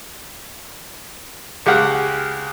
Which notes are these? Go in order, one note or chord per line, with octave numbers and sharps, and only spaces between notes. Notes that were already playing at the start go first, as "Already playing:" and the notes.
C#2 G#3 G4 F5 F#5